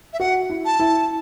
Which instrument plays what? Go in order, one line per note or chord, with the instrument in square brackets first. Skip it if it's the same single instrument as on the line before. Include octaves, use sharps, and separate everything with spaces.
[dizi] E5
[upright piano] F#4 [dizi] F#5
[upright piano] E4
[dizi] A5
[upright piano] E4